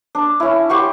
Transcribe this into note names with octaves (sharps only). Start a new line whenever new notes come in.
D4
C#4 E4
G4 C5 F#5 C#6